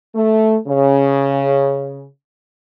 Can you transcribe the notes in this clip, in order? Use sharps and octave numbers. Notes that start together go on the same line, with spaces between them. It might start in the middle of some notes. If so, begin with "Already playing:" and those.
A3
C#3